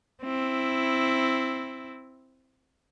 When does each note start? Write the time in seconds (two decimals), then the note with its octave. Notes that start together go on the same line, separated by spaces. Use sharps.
0.24 C4 E4